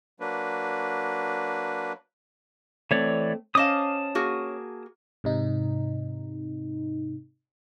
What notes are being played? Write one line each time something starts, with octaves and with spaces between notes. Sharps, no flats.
F#3 A#3 D4 B4
E3 A3 C4 C#5 D5
C#4 C5 D#5 F5 A5 D6 D#6
A#3 F#4 G#4
G#2 C3 D#4